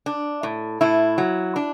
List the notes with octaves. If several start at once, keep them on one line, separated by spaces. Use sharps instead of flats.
D4
A2
A2 E4
F#3
D4